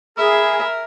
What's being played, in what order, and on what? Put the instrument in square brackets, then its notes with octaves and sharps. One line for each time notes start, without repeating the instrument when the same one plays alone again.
[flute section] G#4 [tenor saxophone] A#4 [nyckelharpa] E5 [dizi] B5